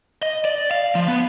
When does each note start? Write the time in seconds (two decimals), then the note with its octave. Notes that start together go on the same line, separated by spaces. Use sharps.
0.22 D#5
0.45 D5
0.71 F5
0.95 F3
1.08 B3